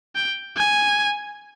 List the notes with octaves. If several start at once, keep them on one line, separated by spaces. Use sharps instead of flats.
G5
G#5